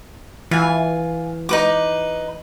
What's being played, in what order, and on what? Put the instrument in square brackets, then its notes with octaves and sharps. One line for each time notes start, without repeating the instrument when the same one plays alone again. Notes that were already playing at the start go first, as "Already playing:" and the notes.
[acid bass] E3 [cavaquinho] F4 G#5
[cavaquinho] D#4 B4 D6